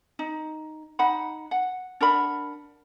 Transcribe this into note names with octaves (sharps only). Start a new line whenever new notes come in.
D#4
D#4 F#5 B5
F#5
D4 A#4 F#5 B5